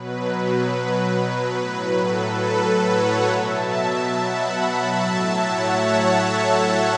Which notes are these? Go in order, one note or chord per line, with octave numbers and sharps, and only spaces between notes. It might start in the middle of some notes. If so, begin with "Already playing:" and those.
Already playing: B2 F#3 B4
B4
B4
A2 F#3 B4
A4
B4
C#5 F#5
B2 F#3 E5 A5
F#5 B5
E5 A5
A2 F#3 E5 A5
C#5 F#5
E5 A5
A4